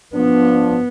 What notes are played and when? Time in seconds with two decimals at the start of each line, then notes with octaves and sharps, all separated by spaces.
0.14 F3 B3 D4